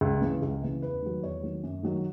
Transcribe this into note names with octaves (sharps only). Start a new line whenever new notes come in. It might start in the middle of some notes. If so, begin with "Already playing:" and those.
C#2
C#3 E3
C#2
C#3 E3
E2 B4
D#3 F#3
E2 C#5
D#3 F#3
F#2
D#3 F#3